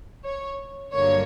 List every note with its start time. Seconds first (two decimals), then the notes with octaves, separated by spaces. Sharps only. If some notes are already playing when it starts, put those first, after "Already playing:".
0.25 C#5
0.93 G2 D3 F#3 A#3 C#5